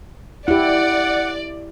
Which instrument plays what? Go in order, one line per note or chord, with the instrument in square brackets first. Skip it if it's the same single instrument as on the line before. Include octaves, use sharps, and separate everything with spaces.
[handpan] E4 G4 [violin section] D5 [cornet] F#5